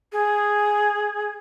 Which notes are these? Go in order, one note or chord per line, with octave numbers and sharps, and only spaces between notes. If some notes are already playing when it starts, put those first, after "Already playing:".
G#4